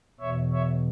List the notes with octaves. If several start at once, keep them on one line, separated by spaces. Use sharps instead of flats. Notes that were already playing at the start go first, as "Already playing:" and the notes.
E2 B2 C#5 E5
C#5 E5